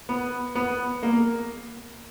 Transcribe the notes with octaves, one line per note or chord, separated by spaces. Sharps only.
B3
B3
A#3